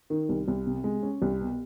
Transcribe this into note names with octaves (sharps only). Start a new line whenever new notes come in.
D#3
C2
C2
C3
G#3
C#4
C2
B2